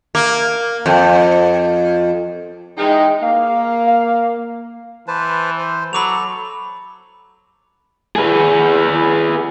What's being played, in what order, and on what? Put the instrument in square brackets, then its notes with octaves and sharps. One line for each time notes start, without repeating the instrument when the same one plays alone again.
[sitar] A#3
F2
[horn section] E3 G#3 D#4 [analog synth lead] G5
[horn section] A#3 [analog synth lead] F5
[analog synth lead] F5
[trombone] E3 [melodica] B4 C5 A5
[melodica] C5
[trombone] F#3 [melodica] A4 [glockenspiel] B5 D6 F7
[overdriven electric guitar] G#4 B4